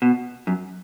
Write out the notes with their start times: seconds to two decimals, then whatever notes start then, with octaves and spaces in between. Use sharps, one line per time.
0.02 B2
0.47 F#2